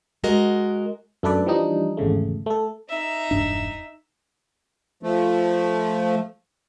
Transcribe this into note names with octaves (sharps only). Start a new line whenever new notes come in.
G#3 F#4 A#4 D#5
F#2 A3 D4 A4 B4 D5
E3 F3 G3 D4 D#4
G#1 E2 C#3 A3
A3 A4
D#4 E5
E1 G2 D4
F3 A3